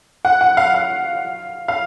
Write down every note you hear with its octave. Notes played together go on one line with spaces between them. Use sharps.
F#5
F#5
F5
F5
F5